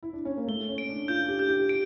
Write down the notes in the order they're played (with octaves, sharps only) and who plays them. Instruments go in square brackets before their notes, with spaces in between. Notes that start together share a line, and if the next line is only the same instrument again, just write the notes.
[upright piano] E4
D4
C#4
A#3
[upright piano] A3 [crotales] G7
[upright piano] C#4
[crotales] D7
[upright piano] D4
[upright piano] F4 [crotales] G6
[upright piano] G4
[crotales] G6
[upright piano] G4
[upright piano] G4 [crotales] D7